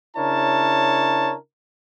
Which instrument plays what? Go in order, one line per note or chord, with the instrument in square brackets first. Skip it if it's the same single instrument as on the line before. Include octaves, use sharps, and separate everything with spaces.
[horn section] C#3 D4 E4 A#4 C#5 A5